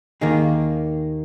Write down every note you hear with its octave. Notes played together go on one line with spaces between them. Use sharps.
D#2 D#3 A#3 D#4 G#4